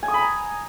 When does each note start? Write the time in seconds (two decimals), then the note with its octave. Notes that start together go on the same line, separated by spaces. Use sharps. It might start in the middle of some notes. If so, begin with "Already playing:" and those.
0.03 G#5
0.08 D#6
0.14 B5
0.19 A#5